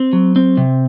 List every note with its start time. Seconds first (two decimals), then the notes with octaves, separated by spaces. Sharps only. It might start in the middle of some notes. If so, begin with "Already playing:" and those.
Already playing: C4
0.13 F#3
0.36 C4
0.57 C3